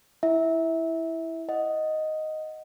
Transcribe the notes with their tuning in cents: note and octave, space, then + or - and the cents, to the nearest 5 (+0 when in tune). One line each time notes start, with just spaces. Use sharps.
E4 +0 E5 -20
D#5 +0 F#5 +0